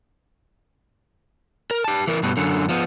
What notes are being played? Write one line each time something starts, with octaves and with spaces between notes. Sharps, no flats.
A#4
G4 A5
E3 A#4
G2 B2
F#2 D3
F3 B3